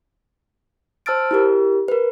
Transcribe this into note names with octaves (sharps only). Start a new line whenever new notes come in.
C5 A5 E6 F6 A6 D7
E4 G4 A#4
A#4 B4